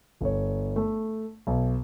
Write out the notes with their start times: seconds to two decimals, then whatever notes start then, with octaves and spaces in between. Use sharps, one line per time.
0.21 G1 C#5
0.76 A3
1.47 B1